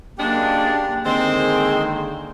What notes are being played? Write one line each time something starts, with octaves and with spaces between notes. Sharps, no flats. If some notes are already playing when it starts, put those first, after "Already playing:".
F#2 G#3 A#3 D4 G4
D3 D#3 G#3 A#3 C4 G#4 C6